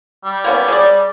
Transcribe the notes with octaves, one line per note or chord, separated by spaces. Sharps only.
G3
A#3 B3 C#4
G#4 D5